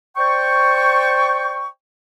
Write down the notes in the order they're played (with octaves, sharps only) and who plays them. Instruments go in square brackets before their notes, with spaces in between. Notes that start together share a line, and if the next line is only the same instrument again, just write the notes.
[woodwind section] C5 D5 G5 C#6